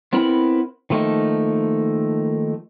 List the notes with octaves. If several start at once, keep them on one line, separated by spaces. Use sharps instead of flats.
B3 C4 E4 A#4 B5
D#3 F3 A3 A#3 D#4